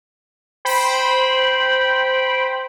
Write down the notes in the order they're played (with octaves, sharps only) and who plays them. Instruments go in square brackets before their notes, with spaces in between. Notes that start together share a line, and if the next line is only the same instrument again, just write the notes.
[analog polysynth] C5 G5 B5